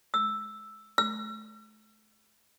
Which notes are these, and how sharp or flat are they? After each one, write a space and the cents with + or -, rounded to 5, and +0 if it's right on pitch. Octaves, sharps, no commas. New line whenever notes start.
E6 +0
E6 +40